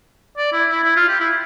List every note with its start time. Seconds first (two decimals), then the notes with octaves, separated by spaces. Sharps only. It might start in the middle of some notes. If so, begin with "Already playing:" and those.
0.37 D5
0.53 E4
0.69 E4
0.84 E4
0.96 F4
1.08 G4
1.20 E4